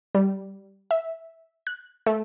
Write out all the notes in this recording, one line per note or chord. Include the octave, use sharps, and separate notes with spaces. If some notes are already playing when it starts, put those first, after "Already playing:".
G3
E5
F#6
A3